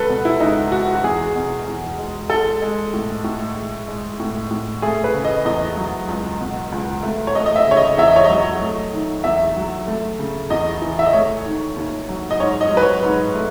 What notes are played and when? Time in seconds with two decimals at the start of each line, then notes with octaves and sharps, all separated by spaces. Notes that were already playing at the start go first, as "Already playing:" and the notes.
Already playing: C#2 A4 B4
0.09 B2
0.25 E4
0.40 C#2 D#4
0.72 G#3 F#4
0.95 F#4
1.04 E2 G#4
1.35 B2
1.67 E2
1.99 G#3
2.30 G#3 A4
2.62 G#3
2.94 A2
3.24 A2
3.57 G#3
3.88 G#3
4.20 A2
4.51 A2
4.82 A3 G#4
5.04 B4
5.14 C#3
5.25 D#5
5.45 E2 D#5
5.77 F#3
6.09 C#2
6.40 B2
6.72 C#2
7.03 A3
7.27 C#5
7.35 A3 D#5
7.46 D#5
7.56 E5
7.67 C#3 C#5
7.77 D#5
7.98 E2 E5
8.07 D#5
8.16 C#5
8.24 D#5
8.30 F#3
8.61 A3
8.93 D#3
9.24 E2 E5
9.56 F#3
9.87 A3
10.19 C#3
10.50 E2 D#5
10.82 E3
10.99 E5
11.06 D#5
11.13 A3 C#5
11.46 D#3
11.76 D#2
12.09 F#3
12.31 D#5
12.40 G#2 C#5
12.61 D#5
12.71 F#3
12.77 B4
12.82 C#5
13.03 G#2
13.35 A3